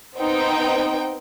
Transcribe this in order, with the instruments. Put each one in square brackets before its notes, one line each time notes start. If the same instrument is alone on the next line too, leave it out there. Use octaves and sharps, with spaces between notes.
[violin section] B3 C4 D#4 G5